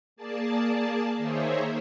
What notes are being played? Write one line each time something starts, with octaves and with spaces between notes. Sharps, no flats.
A#3 G#4 D5 A5
D#3 A#3 G#4 C5 C#5 E5